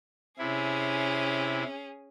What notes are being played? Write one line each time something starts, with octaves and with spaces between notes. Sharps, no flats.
C3 C#4 E4 G#4